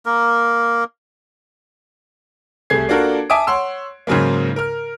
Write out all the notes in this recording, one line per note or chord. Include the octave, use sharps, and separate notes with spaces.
A#3 A#4
C2 A3 G#4 G#6 C7
A#3 D4 F4 F#4 A4 A#4
E5 G#5 A5 D6 D#6 D7
C#5 F#5 C6 E6
G#2 C#3 F#3 G#3 A#3
A#4 F6